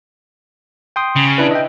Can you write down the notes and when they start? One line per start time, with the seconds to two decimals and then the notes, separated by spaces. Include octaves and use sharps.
0.96 G5 C6 D#6
1.16 C#3
1.38 D4 E4 B4
1.51 D#5 E5 G5